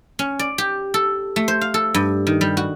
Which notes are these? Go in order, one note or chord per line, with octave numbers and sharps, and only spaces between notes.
C#4
D5
G4
A4
A3
C5
F5
A4
G2
D#3
G3
F#4